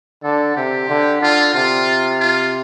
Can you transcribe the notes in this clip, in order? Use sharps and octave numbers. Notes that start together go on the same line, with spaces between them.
D3 A4
C3 G4
D3
D3 F4
C3 F4
F4